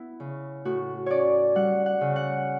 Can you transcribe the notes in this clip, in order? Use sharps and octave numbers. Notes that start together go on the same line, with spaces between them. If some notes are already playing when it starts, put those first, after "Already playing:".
Already playing: B3 E4
C#3
A2 F#4
C#4 C#5 D5
G3 F#5
F#5
C#3
F#5